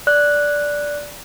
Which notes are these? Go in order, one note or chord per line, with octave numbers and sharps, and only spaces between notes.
D5 F#6